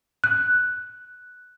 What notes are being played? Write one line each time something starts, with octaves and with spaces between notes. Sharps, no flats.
F#6